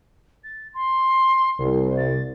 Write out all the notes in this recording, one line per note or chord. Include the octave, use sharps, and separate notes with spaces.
A6
C6
C2
A6